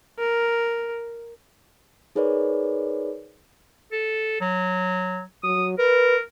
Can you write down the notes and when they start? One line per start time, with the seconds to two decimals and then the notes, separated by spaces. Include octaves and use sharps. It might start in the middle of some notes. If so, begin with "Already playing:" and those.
0.19 A#4
2.16 D#4 G#4 A#4 B4 C#5 D5
3.92 A4
4.41 F#3
5.44 F#3 D#6
5.78 A#4 B4